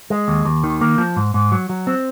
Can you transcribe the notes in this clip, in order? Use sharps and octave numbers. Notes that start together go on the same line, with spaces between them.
G#3
D#2
D#2
D#3
A#3
F3
G#2
G#2
F#3
F#3
C4